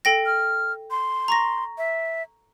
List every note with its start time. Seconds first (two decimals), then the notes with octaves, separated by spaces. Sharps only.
0.05 A4 G5 A#6
0.26 F6
0.91 C6
1.28 A#5 C#6 A#6
1.78 E5